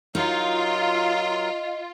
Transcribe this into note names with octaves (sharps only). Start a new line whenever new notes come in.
F#3 D#4 F4 A#4